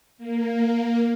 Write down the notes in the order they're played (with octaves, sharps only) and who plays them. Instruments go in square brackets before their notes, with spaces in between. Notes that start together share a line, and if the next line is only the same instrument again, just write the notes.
[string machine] A#3